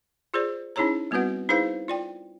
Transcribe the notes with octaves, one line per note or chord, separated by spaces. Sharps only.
F4 G#4 C5 D5
C#4 D#4 E4 G#4 C#5 A#5
G3 B3 C4 F#4 B4 F#5
D#4 E4 G#4 B4 C5 F5
F4 D5 G5